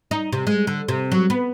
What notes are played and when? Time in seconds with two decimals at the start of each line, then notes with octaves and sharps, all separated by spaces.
0.11 D#4
0.32 C3
0.47 G#3
0.67 D3
0.88 C3
1.12 F#3
1.30 B3